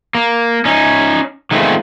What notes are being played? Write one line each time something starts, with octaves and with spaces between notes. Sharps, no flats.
A#3
C#4 D#4
D#3 G#3 A3 B3 C4 F4